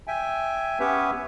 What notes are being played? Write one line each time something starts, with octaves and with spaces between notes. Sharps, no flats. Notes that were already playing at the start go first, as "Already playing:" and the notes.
E5 G5 G#5
B3 C#4 G4 B4 C#5 E5